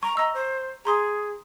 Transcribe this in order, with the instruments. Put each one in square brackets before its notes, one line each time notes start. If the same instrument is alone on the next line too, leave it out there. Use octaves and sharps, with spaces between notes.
[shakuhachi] A#5 [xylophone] C#6
[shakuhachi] D#5 [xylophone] A#5 E6
[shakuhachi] C5
[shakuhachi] G#4 [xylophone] A#5 C6 D#6